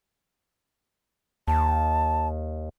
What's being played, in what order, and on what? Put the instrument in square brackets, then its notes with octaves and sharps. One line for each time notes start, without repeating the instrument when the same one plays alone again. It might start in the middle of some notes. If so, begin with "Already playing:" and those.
[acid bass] D#2 [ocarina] A5